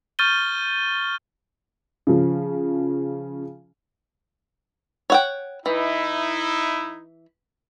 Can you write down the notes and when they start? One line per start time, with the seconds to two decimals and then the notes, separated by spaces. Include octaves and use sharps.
0.19 C#6 F6 G6 A6 D#7 G7
2.07 C#3 F3
5.10 C#5 F#5 G5
5.66 E3 D#4 E4